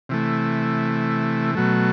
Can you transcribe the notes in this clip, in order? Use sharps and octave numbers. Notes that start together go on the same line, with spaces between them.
C3 E3 A3
B2 F#3 A3